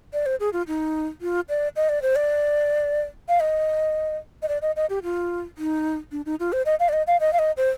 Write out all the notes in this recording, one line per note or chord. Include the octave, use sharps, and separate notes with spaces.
D5
C5
G#4
F4
D#4
F4
D5
D#5
D5
C5
D5
F5
D#5
D#5
D5
D#5
D#5
G4
F4
D#4
D4
D#4
F4
C5
D#5
F5
D5
D#5
F5
D#5
F5
D#5
C5